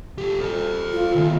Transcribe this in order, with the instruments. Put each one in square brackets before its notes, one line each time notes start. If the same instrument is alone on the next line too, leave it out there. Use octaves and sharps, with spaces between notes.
[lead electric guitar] G4 A4
A4 C5
[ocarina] F4
[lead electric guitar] D#3 B3